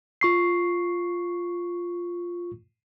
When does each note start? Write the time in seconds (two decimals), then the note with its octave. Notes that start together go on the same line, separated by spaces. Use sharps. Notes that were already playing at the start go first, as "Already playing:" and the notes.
0.21 F4 C#6 C7